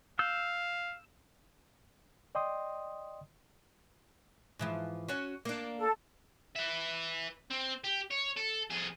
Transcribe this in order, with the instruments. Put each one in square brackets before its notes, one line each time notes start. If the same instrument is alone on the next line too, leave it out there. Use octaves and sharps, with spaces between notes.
[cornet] F5 [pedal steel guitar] E6 G6
[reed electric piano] D5 D#5 G5 C6 D#6
[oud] G#2 E3 F3
C#4 F#4 C#5
A#3 D4
[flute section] A4
[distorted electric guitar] B4 E5
C4
G4
C#5
A4
F2 G#4